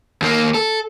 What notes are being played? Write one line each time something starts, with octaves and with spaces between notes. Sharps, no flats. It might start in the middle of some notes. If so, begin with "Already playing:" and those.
D#2 A#3
A4